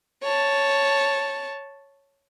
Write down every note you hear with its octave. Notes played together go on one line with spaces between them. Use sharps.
C#5 A5